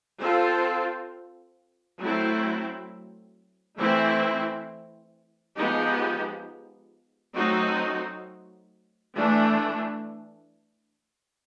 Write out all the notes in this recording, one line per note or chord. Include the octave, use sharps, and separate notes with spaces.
C4 F4 A4
F#3 A3 C4 E4
E3 A3 C4 E4
F3 G#3 B3 D#4 G4
F#3 A3 C4 D#4 F#4
E3 A3 D4